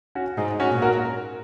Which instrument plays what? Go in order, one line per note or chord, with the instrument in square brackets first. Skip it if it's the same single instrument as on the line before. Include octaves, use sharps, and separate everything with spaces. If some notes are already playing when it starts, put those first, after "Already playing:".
[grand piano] C#4 F#4
[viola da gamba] G#2 [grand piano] D#4 G#4
[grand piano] C#4 F#4
[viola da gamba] A#2
[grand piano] F#4 A#4